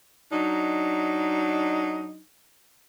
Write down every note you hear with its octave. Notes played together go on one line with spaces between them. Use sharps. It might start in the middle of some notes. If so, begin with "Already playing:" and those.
F#3 D4 D#4